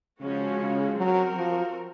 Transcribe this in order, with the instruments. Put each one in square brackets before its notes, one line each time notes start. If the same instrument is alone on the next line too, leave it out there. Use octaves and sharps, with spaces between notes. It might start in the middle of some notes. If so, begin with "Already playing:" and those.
[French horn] C#3 [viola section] F3 G#3 C#4 F#4
[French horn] C#3
[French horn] F#3 [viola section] C4 F#4 A#4
[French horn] F3